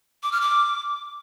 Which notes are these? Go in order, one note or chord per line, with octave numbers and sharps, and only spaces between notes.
D6
F6
D6